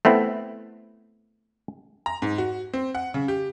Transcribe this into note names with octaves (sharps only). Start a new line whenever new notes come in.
A3 B3 C4 E4
A#5
G#2
F#4
C4
F#5
C#3
G4